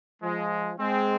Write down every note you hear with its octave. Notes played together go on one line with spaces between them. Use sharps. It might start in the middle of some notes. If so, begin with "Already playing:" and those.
F3 G#3
G#3 C4